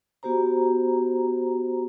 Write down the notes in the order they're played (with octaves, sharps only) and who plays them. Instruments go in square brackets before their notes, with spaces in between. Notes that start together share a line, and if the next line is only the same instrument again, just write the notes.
[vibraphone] B3 F#4 G4 C5 A#5